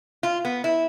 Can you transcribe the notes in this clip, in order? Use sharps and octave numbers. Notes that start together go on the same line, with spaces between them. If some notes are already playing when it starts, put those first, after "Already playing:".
F4
B3
E4